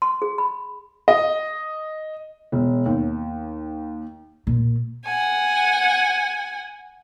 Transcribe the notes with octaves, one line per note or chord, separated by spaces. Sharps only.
C6
G#4
B5
D#5
E1
D#2
A#2
F#5 G#5